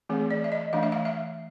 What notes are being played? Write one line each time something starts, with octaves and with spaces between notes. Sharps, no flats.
E3 A3 C4 G#4
D5
E5
D#5
E3 A3 D4 F5
E5
F5
E5